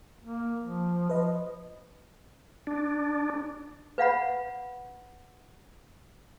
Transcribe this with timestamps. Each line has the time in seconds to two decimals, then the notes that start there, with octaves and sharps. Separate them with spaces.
0.24 A#3
0.61 F3
1.10 F3 B4 D#5
2.67 D4
3.98 B4 F5 F#5 B5